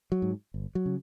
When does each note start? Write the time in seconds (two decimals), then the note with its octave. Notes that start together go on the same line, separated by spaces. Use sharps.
0.12 F#3
0.22 G#2
0.54 G1
0.75 F#3
0.86 C#3